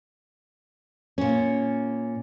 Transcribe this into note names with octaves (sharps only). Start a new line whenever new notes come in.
A#2 C#4